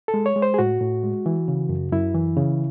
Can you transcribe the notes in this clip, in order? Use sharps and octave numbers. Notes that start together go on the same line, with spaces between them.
A4
G#3
C#5
G#3
C5
G#4
A2 F#4
A2
G#3
E3
C#3
F#2
F#2 E4
E3
C#3